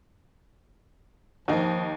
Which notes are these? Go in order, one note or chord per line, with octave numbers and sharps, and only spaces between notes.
D#2 F3 D#4